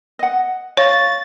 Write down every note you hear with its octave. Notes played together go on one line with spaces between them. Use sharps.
D#5 F#5
C#5 F5 C#6 A6 A#6